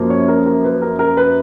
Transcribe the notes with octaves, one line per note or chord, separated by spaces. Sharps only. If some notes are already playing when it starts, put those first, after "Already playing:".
Already playing: F#2 F3 A#3
C#5
A#4
A#4
B4
A#4
A#4
B4